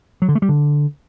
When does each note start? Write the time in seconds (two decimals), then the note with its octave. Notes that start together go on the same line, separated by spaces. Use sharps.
0.22 F#3
0.29 D3
0.35 A3
0.42 G3
0.49 D3